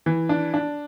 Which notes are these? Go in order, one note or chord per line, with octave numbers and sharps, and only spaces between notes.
E3
D4
D4